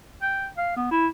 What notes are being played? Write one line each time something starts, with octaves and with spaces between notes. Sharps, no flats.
G5
F5
B3
E4